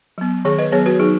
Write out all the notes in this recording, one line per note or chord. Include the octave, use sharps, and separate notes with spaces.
F#3 B3
D#3 G#4 C#5
B4 D#5
F#3 B3 G#4 C#5
F#4 B4
F#3 D#4 G#4